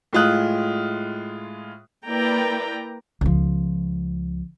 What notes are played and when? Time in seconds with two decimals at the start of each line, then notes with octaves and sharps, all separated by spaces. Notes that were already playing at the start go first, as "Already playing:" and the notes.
0.13 A2 G#3 F4 D#6 F#6
2.06 A#3 E4 B4 D5 G5 A#5
3.21 C#2 F3